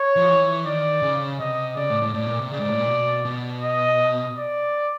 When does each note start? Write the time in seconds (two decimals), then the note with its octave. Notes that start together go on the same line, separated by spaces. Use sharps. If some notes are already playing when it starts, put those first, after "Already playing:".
Already playing: C#5
0.17 F3
0.29 E3
0.65 D#3 D5
1.02 C#3
1.40 C3 D#5
1.77 C#3 D5
1.90 A2
2.02 A2
2.14 A2 D5
2.26 A#2
2.39 C3
2.51 C#3 D5
2.60 G#2
2.70 A2
2.79 A#2
2.88 B2
3.25 B2
3.62 D#5
4.37 D5